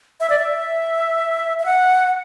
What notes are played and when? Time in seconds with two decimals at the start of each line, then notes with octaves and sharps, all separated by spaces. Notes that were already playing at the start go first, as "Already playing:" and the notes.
0.20 E5
0.30 D5
0.39 E5
1.60 E5
1.65 F#5